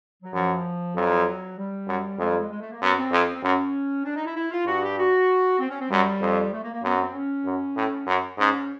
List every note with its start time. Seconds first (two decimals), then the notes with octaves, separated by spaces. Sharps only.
0.23 F#3
0.33 F#2 F3
0.96 F2 F#3
1.57 G3
1.88 F#2
2.19 F2 G#3
2.29 G3
2.39 G#3
2.50 G#3
2.60 A3
2.71 A#3
2.82 F#2 B3
2.97 C4
3.12 F2
3.35 C4
3.43 F#2 C#4
4.05 D4
4.15 D#4
4.25 E4
4.36 E4
4.51 F4
4.66 G2 F#4
4.82 G4
4.98 F#4
5.60 C4
5.70 C#4
5.80 C4
5.90 F#2 G3
6.21 F2
6.52 A3
6.63 A#3
6.73 A#3
6.83 F#2 B3
6.99 C4
7.14 C#4
7.46 F#2
7.77 A2
8.07 F#2
8.38 G#2 C#4